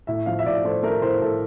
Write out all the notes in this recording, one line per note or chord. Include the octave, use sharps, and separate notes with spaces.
A2 E5
F3 F5
E5
A2 D5
A3 C5
A3 A#4
A2 C5
A2 A4